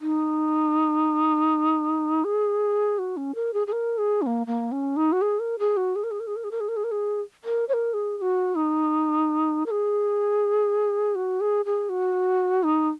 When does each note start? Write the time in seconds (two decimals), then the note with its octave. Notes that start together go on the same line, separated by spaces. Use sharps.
0.01 D#4
2.24 G#4
2.99 F#4
3.17 C#4
3.35 A#4
3.54 G#4
3.67 G#4
3.72 A#4
3.98 G#4
4.22 C#4
4.26 A#3
4.47 A#3
4.72 C#4
4.96 D#4
5.12 F#4
5.22 G#4
5.39 A#4
5.59 G#4
5.77 F#4
5.96 G#4
6.04 A#4
6.11 G#4
6.20 A#4
6.27 G#4
6.36 A#4
6.44 G#4
6.51 A#4
6.60 G#4
6.68 A#4
6.77 G#4
6.84 A#4
6.91 G#4
7.44 A#4
7.69 C#5
7.73 A#4
7.94 G#4
8.18 G#4
8.22 F#4
8.55 D#4
9.66 A#4
9.71 G#4
11.15 F#4
11.41 G#4
11.65 G#4
11.89 F#4
12.63 D#4